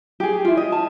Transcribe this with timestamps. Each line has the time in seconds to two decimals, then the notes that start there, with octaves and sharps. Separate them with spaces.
0.20 G4 G#4
0.45 E4 F4
0.57 D#5
0.72 A5